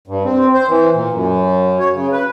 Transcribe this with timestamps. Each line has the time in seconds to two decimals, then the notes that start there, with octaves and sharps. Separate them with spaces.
0.07 G2
0.24 C4
0.54 C5
0.68 E3
0.94 A#2
1.12 F#2
1.79 C#5
1.94 C#3
2.12 B4